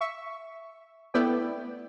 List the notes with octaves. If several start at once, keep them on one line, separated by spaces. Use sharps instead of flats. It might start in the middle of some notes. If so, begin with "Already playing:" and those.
E5 C#6
A3 B3 E4 B4 D5 G5